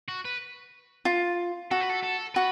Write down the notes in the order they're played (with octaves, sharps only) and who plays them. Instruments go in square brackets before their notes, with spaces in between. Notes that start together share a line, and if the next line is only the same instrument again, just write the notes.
[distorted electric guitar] F#4
B4
[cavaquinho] F4
[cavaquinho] F#4 [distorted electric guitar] A4
[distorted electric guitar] B4
A4
A4
[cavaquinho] F#4 [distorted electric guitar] B4